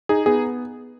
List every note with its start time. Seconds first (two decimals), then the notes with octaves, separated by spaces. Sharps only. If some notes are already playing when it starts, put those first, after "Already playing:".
0.09 D#4 G#4
0.26 B3 G#4